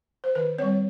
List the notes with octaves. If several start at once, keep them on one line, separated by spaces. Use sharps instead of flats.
C5
D#3 B4
G3 C4 C#5